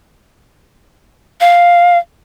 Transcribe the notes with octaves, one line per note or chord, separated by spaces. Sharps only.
F5